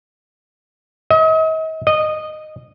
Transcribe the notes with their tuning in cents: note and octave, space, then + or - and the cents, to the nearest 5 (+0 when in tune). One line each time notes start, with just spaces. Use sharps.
D#5 +40
D#5 -15